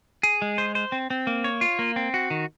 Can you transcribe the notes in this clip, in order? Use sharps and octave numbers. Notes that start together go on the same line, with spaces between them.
G#4
G#3
C5
C5
C4
C4
A#3
C#5
F4
A#3
C4
F#4
D#3